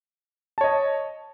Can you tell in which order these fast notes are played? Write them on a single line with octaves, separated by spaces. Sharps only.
A5 C#5 D#5